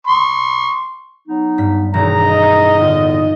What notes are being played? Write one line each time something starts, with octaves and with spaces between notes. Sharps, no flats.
C6 C#6
F#3 B3 D#4
G2 B6
E1 D#2 E4 G#4 A#5
D#5
E2 A2 D3 D#4 F4 A6